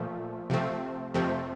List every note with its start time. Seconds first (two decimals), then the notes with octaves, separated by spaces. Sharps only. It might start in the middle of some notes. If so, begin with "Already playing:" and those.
Already playing: A#2 F3 A3
0.50 C3 F3 A3 C4
1.14 F2 C3 F3 A3 C4